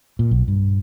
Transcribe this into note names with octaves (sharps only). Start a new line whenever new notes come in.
A#2
B1
G2